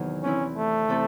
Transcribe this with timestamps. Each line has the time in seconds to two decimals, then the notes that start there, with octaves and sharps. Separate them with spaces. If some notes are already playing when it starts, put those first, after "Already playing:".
Already playing: E2 C3 D#3 F#3
0.23 E3 C4 C#4 E4
0.56 A3
0.88 C3 E3 C4 A4